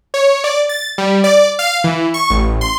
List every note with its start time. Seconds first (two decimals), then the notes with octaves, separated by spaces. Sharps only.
0.14 C#5
0.44 D5
0.69 A6
0.98 G3
1.24 D5
1.59 F5
1.84 E3
2.14 C#6
2.30 A1
2.61 C6